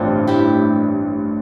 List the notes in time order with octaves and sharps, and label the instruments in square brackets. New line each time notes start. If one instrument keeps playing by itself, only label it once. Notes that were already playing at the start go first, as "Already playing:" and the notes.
Already playing: [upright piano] A1 G2 D3 [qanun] C4 D4 F4
[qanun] E4 G4